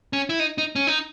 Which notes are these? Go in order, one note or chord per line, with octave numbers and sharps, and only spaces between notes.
C#4
E4
D#4
D#4
C#4
D#4